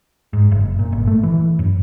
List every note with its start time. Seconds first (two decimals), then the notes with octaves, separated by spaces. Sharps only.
0.33 G#2
0.52 F#1
0.79 A#2
0.92 G1
1.07 A3
1.23 E3
1.59 F#2